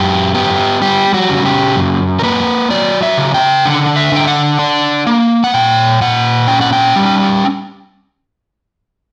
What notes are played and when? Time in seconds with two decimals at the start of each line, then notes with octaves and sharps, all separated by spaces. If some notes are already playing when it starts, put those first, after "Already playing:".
Already playing: F#2 G4
0.34 B3 G4
0.82 G3 G4
1.14 F#4
1.29 C#3
1.46 G4
1.76 F#2
2.19 A#4
2.23 A#3 B4
2.70 F#3 D5
3.03 E5
3.17 C#3
3.34 G5
3.66 D3 F#5
3.96 E5
4.12 D3 G5
4.27 F#5
4.59 D4
5.07 A#3
5.44 F#5
5.54 A#2 G5
6.01 A#2 F#5
6.48 C#4 G5
6.61 F#5
6.73 G5
6.96 G3